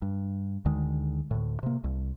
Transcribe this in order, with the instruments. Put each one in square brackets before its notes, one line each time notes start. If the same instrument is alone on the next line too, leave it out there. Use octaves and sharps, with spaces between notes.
[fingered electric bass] G2
D2 D3 D#3 G#3
D2 A2
C3 A#3
C2